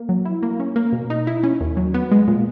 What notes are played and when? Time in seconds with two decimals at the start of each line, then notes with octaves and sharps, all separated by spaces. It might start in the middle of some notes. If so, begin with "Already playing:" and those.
Already playing: A#3
0.09 F#3
0.25 E4
0.43 A#3
0.60 C#4
0.76 A#3
0.92 B2
1.10 D#4
1.27 E4
1.43 C#4
1.60 D#2
1.77 F#3
1.94 B3
2.11 G#3
2.28 A#2